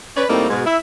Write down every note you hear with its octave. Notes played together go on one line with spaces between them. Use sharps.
C#4 B4 D5
A2 G3 A3 A#3 C4 D#4
G#2 B2 G#3
E4 E5